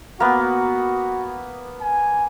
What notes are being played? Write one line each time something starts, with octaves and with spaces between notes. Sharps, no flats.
A#3 B3 F#4
G#5